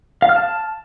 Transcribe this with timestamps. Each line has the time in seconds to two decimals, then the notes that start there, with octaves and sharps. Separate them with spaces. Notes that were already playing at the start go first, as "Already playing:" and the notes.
0.22 F5
0.29 F6
0.36 A5